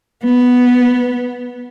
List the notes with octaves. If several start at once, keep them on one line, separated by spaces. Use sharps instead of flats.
B3